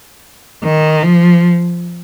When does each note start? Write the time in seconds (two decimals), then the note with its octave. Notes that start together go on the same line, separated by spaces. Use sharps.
0.64 D#3
1.03 F3